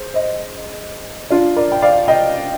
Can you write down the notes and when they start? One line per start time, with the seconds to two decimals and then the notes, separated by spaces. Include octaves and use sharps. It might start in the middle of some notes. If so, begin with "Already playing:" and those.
Already playing: G#4 C5
0.14 C5 D#5
1.30 D4 F4
1.56 A#4 D5
1.72 G5
1.82 D5 F5
2.08 D#5 G5